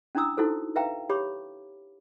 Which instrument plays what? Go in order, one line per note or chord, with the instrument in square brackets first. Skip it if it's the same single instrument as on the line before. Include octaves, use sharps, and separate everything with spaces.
[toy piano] C#4 D4 E4 A#5 D#6 E6
D#4 E4 F#4 A4 C5
B4 E5 F5 G5 A#5
G4 C#5 B5 D6